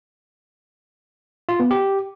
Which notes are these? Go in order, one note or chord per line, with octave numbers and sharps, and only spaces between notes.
F4
B3
G4